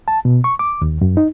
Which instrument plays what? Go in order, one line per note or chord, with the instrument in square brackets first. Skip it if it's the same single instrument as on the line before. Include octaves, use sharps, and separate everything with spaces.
[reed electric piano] A5
B2
C#6
D6
D#2
F#2
D#4